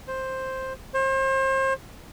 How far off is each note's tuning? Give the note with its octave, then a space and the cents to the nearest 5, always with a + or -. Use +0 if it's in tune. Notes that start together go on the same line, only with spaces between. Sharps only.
C5 +5
C5 +35